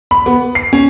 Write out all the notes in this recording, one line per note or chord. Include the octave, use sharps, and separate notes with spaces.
B5
B3
C7
C#4